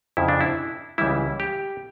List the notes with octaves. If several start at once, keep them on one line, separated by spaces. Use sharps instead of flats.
F2 C#3 F3 E4
D4
E4
C#2 C#3 E3 G3 E4
G4